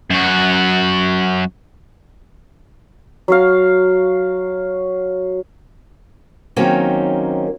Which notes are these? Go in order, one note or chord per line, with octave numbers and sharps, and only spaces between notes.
F#2 F#4
F#3 F#4 F5
D#3 F#3 A#3 C4 C#4 D#4